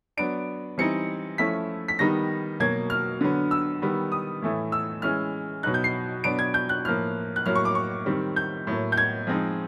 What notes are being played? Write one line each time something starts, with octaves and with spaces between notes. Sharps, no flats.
F#3 B3 D4 D7
E3 G3 C4 D#4 C#7
F3 A3 C#4 E4 B6
B6
D#3 G3 B3 D#4 A#6
B2 F#3 A#3 G#6
F6
D3 F#3 B3
E6
D#3 G3 B3
D#6
A2 E3 A3
E6
E3 G#3 C#4 F6
B2 F#3 B3 D#4 F#6
G6
C7
B2 F#3 B3 D4 D7
G#6
G6
F#6
A2 F3 A#3 F6
F#6
A2 F#3 A#3 F6
C#6
D6
C#6
D#3 G3 C4
G6
A2 F#3 A#3
G6
G#6
F3 G#3 C4 D#4